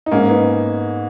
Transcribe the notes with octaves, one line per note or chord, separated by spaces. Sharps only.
D#4
G#2 A#3 C#4
B3 D#4